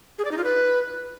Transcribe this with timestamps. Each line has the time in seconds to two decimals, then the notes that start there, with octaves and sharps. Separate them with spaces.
0.18 G#4
0.25 D5
0.31 D#4
0.38 F4
0.44 B4